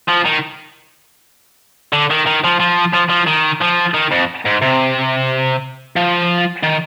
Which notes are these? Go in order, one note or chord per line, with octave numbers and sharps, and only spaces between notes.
F3
D#3
D3
D#3
D#3
F3
F3
F3
F3
D#3
F3
D#3
F2
G#2
C3
F3
D#3